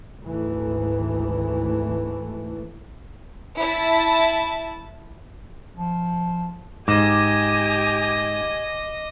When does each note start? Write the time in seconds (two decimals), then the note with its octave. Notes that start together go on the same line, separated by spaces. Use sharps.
0.21 G#1 D2 G#2 E3 A3
3.60 E4 A5
5.76 F3
6.88 G#2 G4 D#5 G#5 D6 A#6 E7